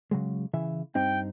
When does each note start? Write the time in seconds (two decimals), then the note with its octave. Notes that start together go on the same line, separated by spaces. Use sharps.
0.11 C#3 F#3 G#3
0.53 C#3 E3 E5
0.95 G2 C4 D#4 G5